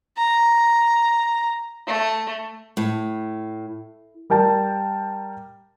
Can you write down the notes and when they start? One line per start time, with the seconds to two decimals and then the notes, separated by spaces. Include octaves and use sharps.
0.17 A#5
1.87 A3
2.77 A2
4.30 G3 A#4 G5 A5